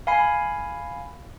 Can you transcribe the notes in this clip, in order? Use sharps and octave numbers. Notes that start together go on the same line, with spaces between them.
F5 G#5 B5 C7